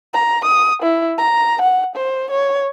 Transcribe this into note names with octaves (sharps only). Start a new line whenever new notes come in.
A#5
D#6
E4
A#5
F#5
C5
C#5